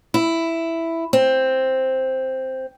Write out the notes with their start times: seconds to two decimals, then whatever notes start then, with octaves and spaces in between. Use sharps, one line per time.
0.14 E4
1.13 C4